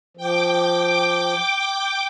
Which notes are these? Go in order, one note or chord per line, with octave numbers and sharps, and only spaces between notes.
F3 G5 D6